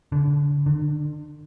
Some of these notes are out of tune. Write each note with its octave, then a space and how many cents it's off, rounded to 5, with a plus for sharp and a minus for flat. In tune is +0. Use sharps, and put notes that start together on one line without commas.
D3 -30
D3 +35